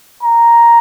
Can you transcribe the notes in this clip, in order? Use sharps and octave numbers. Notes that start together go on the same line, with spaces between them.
A#5